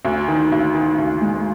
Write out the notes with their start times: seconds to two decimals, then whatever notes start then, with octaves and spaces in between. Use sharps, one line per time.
0.05 D2
0.28 D#3
0.52 D2
0.75 D#3
0.98 D2
1.21 G#3